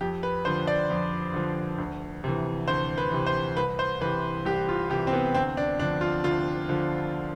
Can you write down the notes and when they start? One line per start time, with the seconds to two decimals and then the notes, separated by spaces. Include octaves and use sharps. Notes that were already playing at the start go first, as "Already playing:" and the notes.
0.01 F2 G4
0.23 B4
0.45 D3 F3 C5
0.67 D5
0.90 F2
1.34 D3 F3
1.78 D2
2.24 C3 E3
2.68 D2 C5
2.98 B4
3.12 C3 E3
3.26 C5
3.57 C2 B4
3.79 C5
4.01 E3 B4
4.05 C3
4.45 C2 G4
4.69 F4
4.90 C3 G4
4.93 E3
5.07 C4
5.13 B3
5.34 D2 C4
5.57 D4
5.80 D3 F3 D4
6.01 F4
6.24 D2 F4
6.69 D3 F3